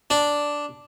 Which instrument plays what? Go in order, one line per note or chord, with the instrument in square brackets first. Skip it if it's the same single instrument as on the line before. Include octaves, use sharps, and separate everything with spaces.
[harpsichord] D4